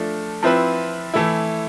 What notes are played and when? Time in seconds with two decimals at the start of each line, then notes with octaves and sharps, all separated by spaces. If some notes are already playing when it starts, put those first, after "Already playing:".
Already playing: F3 A3 D4 A4
0.43 F3 C4 E4 B4
1.14 E3 A3 E4